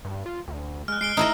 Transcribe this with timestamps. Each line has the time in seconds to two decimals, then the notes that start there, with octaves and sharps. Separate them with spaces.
0.05 G2
0.26 F4
0.48 D2
0.88 G#3 F6 F#6
1.01 G#3 C7 D7 G7
1.17 A3 D#4 E4 D#5